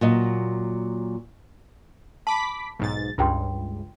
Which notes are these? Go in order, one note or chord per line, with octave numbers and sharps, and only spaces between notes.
A#2 F#3 D#5
A5 B5 D6 B6
B1 G#2 A6
C#2 G2 F4 G5 C6